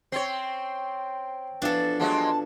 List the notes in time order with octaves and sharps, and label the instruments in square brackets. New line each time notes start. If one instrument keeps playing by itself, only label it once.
[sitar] C4 C#5 [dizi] G5 [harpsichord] C6
[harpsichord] B2 E3 F3 [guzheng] D4 A4
[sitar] F#3 G#3 A#3 [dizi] A5